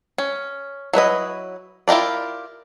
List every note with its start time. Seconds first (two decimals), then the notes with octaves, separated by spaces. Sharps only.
0.18 C#4
0.93 F#3 E4 B4 D#5
1.88 E4 F4 G4 A#4 D5